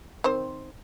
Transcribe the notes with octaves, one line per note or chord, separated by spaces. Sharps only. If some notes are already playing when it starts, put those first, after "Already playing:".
D#3 C4 C5